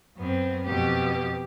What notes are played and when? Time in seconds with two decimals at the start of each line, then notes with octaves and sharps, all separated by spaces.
0.17 F#2 B3 C4
0.65 F2 B2 G4